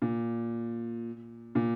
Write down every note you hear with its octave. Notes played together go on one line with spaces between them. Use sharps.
A#2
A#2